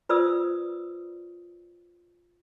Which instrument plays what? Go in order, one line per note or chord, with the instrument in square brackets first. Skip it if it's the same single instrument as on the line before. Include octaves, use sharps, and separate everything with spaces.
[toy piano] F4 B4 C5 D5 D#6 E6